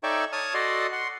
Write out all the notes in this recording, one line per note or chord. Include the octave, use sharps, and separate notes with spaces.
D#4 A4 C#5 D5 E5 G5
C#5 A5 D#6 F6
F#4 A4 D5 D#5 C6
F#5 C6